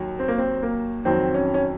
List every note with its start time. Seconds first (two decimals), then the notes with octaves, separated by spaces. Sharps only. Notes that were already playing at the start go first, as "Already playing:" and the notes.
Already playing: D#2 F#3
0.19 C4
0.28 A#3
0.38 C4
0.63 A#3
1.05 F2 D#3 F#3 C4
1.34 C#4
1.54 C#4